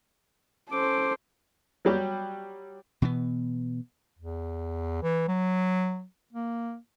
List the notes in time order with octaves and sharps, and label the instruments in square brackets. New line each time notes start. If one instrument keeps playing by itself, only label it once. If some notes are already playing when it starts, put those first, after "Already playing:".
[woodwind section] C#4 D6 [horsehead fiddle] A4 C5
[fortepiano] F#3 G3 G4
[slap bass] B2 E3 B3
[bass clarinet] E2
E3
F#3
A#3